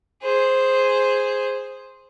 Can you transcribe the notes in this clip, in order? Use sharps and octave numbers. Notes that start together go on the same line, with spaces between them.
G#4 C5